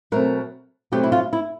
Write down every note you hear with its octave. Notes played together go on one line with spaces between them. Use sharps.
B2 F#3 A3 C4 A#4
B2 F#3 A3 C4 G4
E4
F4
E4